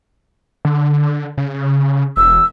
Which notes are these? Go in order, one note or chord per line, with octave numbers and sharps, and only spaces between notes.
D3
C#3
E1 E6